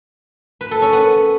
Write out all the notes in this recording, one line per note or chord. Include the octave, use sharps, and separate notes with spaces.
B4
A4
C#4
B3